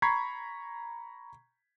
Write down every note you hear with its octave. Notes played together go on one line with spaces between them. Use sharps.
A#5 B5 C#6 G#6 B6 C7